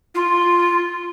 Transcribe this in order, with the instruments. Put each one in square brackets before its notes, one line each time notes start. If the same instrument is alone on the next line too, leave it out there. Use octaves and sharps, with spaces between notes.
[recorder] F4